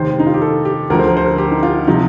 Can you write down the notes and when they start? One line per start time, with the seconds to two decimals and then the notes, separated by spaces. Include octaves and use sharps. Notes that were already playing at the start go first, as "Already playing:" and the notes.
Already playing: F1 D#2 D#3 C5
0.19 D#4
0.27 F4
0.34 G4
0.42 A4
0.65 G4
0.90 D2 D3 F3 A#4
0.99 C5
1.08 A#4
1.17 C5
1.26 A#4
1.38 G4
1.51 D#4
1.63 F4
1.87 C3 F3 D#4